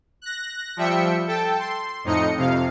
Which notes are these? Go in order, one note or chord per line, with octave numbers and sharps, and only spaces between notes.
F#6 A#6
F3 G3 E5 G5 C#7
A4 G5 A5
C6
F2 A2 D#4 D#5 C#7
F2 C3 F5